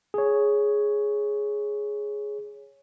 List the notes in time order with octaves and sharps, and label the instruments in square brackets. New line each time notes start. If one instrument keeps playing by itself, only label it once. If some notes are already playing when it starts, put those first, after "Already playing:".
[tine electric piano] G#4 C#5